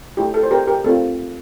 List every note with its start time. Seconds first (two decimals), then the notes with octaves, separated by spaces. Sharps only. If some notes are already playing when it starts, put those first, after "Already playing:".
0.17 A3 E4 G4
0.34 A4
0.43 C5
0.51 G4 A#4
0.67 G4 A#4
0.84 A3 C4 F4 A4